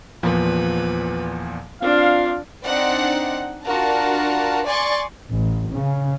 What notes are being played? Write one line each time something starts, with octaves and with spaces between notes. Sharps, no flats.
E2 A#2 F3 B4
C4 D4 F4 F5
C4 D4 D#4 D5 F#5
D4 F4 F#4 A#4 A5
D5 G#5 C6 C#6 A6
A1
C#3